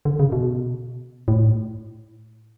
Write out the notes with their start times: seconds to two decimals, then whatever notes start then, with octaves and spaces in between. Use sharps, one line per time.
0.05 D3
0.19 C#3
0.32 B2
1.28 A2